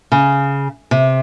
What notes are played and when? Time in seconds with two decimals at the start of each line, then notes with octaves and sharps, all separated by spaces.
0.12 C#3
0.91 C3